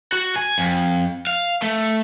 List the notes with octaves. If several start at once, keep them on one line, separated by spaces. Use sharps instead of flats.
F#4
G#5
F2
F5
A3